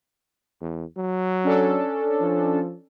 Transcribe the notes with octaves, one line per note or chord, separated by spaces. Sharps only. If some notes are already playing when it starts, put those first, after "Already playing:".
E2
F#3
C#4 D4 A4
F3